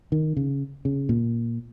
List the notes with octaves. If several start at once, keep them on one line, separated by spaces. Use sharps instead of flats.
D#3
C#3
C#3
A#2